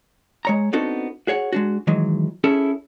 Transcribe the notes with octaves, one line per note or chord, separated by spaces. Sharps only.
G#3 C#5 A#5
B3 C4 D4 D#4 F#4 A4
F#4 G#4 C#5 F#5
G#3 D4 F#4
D#3 E3 F#3 G#3
C#4 E4 G#4 A4